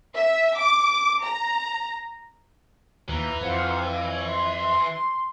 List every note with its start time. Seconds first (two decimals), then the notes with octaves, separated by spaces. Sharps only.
0.16 E5
0.57 D6
1.23 A#5
3.09 D#2 E3 A#5
3.41 F2 F4 C5 F#5
4.06 C#5
4.28 C6